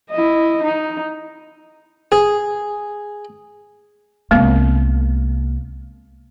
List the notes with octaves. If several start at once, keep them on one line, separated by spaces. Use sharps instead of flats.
E4 D#5
D#4
G#4
C2 G#3 A#3 B3